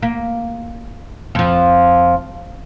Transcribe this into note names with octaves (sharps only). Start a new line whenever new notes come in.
A#3
F2 F3